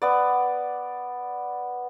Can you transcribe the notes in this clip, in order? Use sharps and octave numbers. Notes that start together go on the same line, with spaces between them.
B3 D5